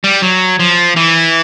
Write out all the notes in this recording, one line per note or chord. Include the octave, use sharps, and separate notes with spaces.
G3
F#3
F3
E3